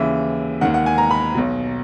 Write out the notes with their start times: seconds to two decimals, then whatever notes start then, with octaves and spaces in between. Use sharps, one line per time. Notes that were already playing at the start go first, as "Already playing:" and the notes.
Already playing: D#2 C#3 E3 E5
0.61 D#2 D#3 F#5
0.74 F#5
0.86 G#5
0.98 A#5
1.11 B5
1.35 B1 B2